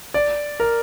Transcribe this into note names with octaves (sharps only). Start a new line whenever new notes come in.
D5
A#4